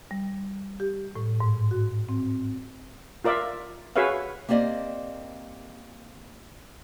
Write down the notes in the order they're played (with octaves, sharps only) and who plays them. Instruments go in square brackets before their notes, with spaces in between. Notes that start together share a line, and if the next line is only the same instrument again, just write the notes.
[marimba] G3
G4
A2
G#2
F#4
C4
[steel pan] F4 A#4 D5 E5 F5
F#4 G#4 B4 C#5 E5 F5
[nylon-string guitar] A#3 C4 G4 D5 D#5